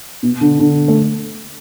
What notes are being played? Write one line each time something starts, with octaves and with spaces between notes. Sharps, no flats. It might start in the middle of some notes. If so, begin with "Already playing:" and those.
B2
D3
D3
A3